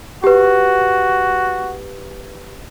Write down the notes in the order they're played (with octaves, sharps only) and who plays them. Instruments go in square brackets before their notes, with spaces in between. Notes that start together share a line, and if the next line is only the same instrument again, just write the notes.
[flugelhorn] F#4 [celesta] G4 B4